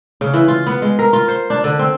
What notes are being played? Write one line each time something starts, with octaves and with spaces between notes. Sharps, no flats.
C#3
E3
F4
B3
G#3
A#4
F4
C5
D4
D3
C4